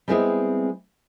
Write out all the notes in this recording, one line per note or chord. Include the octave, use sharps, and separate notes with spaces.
G3 G#3 B3 C4 E4 G#4